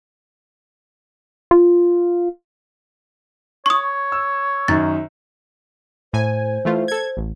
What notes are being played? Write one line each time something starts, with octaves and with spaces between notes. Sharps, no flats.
F4
C#5 C#6 D#6
E6
F#2 D#3 A6
A2 C5 G#5
E3 A3 F4
A4 G#6
A1